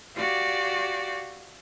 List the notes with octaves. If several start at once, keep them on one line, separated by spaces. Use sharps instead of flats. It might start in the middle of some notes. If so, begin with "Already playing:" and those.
F#4 G4 D5 F5